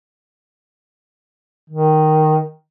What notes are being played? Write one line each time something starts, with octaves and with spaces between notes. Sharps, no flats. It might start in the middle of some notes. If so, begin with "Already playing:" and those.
D#3